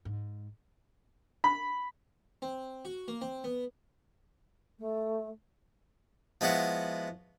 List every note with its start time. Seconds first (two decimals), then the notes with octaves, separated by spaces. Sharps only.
0.05 G#2
1.44 B5
2.42 C4
2.85 F#4
3.08 A#3
3.21 C4
3.44 B3
4.78 A3
6.41 F3 G#3 B3 E4 F#4